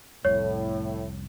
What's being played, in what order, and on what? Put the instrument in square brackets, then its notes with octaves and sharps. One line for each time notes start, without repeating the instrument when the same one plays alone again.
[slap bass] F1 C2 [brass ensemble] A2 [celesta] C#5